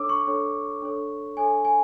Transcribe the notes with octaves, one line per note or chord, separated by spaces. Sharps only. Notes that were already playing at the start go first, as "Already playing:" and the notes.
Already playing: D4 A4 C#5 D6 E6
C#6
D4 A4 C#5
D4 A4 C#5
D4 A4 C#5 G#5
G#5